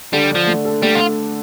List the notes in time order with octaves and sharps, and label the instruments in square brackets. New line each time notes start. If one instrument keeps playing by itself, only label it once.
[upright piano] D3 [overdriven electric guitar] G3
[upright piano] D4
[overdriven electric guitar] F3
[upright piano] A3
A4
[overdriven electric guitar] G3 [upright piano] A3
[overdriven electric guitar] F4